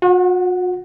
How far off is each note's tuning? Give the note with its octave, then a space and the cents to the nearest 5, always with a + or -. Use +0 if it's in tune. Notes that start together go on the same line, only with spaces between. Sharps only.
F#4 -45 F#5 +0